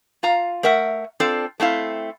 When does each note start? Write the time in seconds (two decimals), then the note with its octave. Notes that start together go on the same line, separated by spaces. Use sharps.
0.23 F4 F5 A#5
0.63 A3 A#4 E5 F#5
1.20 C4 D4 F4 A4
1.60 A3 C4 E4 F5